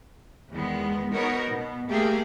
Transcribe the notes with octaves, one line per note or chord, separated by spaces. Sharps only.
E2 D#3 G#3 B3
B3 D#4 F#4 A#4 B4 C#5
B2 B3
A3 A#3 G4 G#4